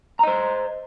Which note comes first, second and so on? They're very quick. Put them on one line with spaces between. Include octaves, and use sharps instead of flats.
A#5 D#5 C5